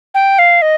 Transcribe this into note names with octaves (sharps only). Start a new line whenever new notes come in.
G5
F5
D#5